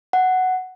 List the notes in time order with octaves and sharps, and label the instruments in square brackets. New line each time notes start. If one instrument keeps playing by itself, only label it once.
[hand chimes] F#5